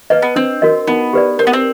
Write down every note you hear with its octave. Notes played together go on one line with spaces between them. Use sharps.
A#3 B4 D#5
B3
C4 D4
F#4 A#4 D#5
B3 D#4
G4 B4 D5
C4 A#4
B3
C4